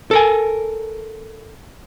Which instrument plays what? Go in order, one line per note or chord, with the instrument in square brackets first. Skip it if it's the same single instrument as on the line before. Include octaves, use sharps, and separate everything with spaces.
[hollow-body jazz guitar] A4 A#4 G#5